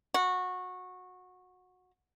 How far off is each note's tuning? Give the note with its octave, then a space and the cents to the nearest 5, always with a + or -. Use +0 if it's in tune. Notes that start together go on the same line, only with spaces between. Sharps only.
F#4 -20